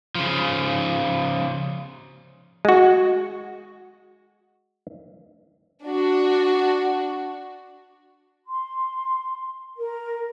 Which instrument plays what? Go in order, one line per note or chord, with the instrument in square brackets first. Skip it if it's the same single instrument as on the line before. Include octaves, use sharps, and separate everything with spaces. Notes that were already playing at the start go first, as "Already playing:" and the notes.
[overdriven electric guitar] C#3 F3
[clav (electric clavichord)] G#3 F#4
[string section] D4 F#4
[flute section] C6
A#4